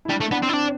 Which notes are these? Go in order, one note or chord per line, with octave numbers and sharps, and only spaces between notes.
E4
G3 D4
A3
B3 D4
C4
E4
C4 D4